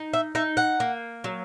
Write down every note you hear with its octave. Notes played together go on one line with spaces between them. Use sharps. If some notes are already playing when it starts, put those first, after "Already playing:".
Already playing: D#4
E5
D#4 E5
F#5
A#3
F#3